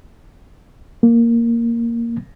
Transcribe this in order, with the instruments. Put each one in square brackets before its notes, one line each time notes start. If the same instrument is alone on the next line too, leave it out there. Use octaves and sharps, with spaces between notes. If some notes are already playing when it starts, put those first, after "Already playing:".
[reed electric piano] A#3